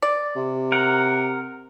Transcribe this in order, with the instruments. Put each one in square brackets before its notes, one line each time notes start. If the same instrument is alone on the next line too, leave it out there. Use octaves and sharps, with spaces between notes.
[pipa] D5
[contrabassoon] C3
[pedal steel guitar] A#4 F#5